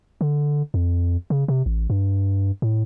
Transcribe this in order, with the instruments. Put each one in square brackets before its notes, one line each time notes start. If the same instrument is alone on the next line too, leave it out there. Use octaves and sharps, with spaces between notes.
[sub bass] D3
F2
C#3
C3
A1
G2
A2